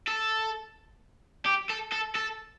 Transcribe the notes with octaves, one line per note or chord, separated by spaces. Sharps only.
A4
G4
A4
A4
A4